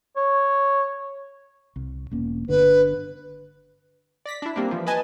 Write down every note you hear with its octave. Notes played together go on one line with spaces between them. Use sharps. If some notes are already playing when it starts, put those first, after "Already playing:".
C#5
C2
E1 A#3 C#4
G1 D3 B4
D5 A#6 B6
D4 E4
G3 A#3 C4 D4
E3 F3
B4 D#5 G#5 A5